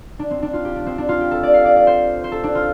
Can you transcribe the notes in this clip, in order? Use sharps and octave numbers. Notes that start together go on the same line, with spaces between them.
D4
C4
D4
F4
G4
D4
C4
D4
F4
G4
A4
D5
F5
D5
D5
C5
C5
A4
D4
F4